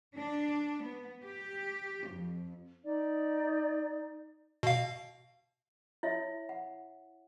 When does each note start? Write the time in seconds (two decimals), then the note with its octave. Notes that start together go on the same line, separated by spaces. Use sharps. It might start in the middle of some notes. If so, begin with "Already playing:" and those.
0.17 D4
0.84 B3
1.24 G4
2.10 F2
2.84 D#4 D5
4.63 B2 F5
6.03 E4 C#5 E5
6.49 F#5